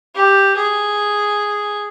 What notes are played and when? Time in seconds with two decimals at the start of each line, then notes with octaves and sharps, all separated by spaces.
0.15 G4
0.57 G#4